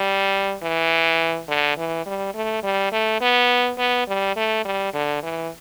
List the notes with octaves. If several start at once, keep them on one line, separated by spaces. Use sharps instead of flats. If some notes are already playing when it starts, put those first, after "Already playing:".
Already playing: G3
E3
D3
E3
G3
A3
G3
A3
B3
B3
G3
A3
G3
D3
E3